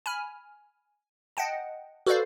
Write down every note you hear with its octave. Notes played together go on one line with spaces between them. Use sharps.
G#5 B5 F6
D#5 F#5 G5 A5
F#4 A4 B4 C5 D5 F5